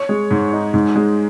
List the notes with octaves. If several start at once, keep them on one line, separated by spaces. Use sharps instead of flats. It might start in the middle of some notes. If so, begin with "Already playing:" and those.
Already playing: C#5
G#3
G#2
D#4
G#2
G#3